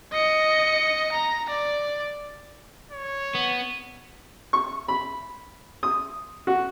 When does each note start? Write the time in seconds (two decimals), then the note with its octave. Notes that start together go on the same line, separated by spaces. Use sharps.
0.12 D#5 C#7
1.12 A#5
1.49 D5
2.92 C#5
3.34 B3
4.53 C#6
4.88 B5
5.83 D#6
6.47 F#4